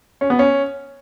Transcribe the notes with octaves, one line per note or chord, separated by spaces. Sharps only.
C#4
B3
C#4